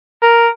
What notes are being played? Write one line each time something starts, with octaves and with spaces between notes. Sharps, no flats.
A#4